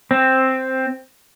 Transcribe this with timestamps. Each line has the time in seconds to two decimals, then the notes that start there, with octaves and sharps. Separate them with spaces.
0.11 C4